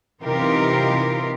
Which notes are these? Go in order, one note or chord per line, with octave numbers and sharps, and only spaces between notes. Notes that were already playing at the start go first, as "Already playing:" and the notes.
C3 E3 D#4 F4 G4 A#4